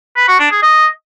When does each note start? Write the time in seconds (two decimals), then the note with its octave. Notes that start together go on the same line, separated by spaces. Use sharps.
0.16 B4
0.28 F#4
0.39 D4
0.51 G#4
0.62 D#5